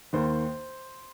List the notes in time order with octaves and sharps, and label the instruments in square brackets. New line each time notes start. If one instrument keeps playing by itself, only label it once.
[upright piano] D#2 D#3 C5